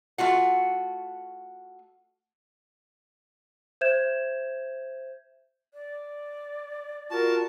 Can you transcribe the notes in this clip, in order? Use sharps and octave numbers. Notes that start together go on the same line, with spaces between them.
A3 F4 F#4 F#5
C5 E5 G6 G#6 E7
D5
F4 F#4 A#4 A5